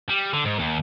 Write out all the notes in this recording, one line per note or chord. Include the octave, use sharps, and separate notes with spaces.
G3
D3
G#2
D#2